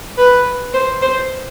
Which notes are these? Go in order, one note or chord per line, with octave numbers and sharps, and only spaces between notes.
B4
C5
C5